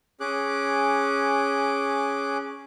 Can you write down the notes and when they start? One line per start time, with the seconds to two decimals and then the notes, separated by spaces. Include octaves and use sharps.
0.20 C#4 G#4 D6 F#6